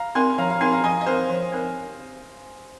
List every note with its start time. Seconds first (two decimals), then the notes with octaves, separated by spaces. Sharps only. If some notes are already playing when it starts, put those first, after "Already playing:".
Already playing: F5 A#5
0.15 C4 D#4 A#4 G#5 C6
0.38 F3 F5 A#5
0.50 F5 A#5
0.61 C4 D#4 A#4 G#5 C6
0.72 F5 A#5
0.84 F3 D#5 G#5
1.01 D#5
1.06 C4 D#4 A#4 C5 F5
1.29 F3
1.52 C4 D#4 A#4